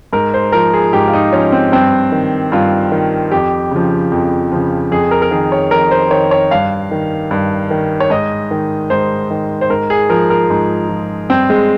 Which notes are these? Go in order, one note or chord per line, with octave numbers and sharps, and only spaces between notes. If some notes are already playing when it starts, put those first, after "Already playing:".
G#2 A#4
C5
F3 A#4
G#4
G#2 G4
F4
D#4
F3 C#4
C4
G2 C4
D#3
G2 F4
D#3
F2 G4
C#3 F3
F2
C#3 F3
F2 G#4
A#4
A#4
D#3 G#4
C#5
F2 A#4
C5
D#3 C#5
C#5
G2 F5
D#3
G2
D#3
C#5
G#2 D#5
D#3
G#2 C5
D#3
C5
G#2 A#4
G#4
F3 A#4
A#4
G#2
F3
G2 C4
G#3